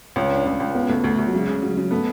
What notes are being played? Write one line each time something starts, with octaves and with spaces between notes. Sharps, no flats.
C#2 C#4
D4
C#2 C#4
C#2
C#3 B3
D2 A3
D2 A3
D2
F#3
C#3 G#3
C#3
C#3 F#3
C#3 F#3
A3 B3